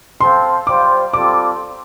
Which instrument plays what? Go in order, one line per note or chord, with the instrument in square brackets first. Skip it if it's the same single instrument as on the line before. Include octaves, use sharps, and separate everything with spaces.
[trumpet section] C4 A4 C5 F5 [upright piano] C6
[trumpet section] G3 F4 C5 F5 [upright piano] D6
[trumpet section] G3 C4 F4 A4 D5 [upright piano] D6